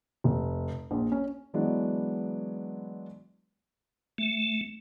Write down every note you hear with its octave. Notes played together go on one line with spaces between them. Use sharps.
F1
A#1
C#4
E3 F#3 G#3 B3 D4
A3